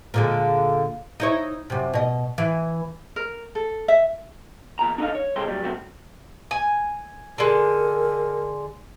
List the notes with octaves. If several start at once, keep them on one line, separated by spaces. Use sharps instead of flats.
A#2 D3 G#3
D#4 E4 C#5
F#2 C3
B2 D#5
E3
A#4
A4
E5
E2 A#2 A#5
D4 D#4 A4 D5 D#5 F5
C#5
C2 C3 G#3 C4 A4 C6
A#2 F#3 G3
G#2 F#3 A3 C4 F#4
G#5
D3 G#3 A#4